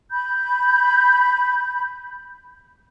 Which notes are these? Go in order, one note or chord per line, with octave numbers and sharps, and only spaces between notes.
B5 G6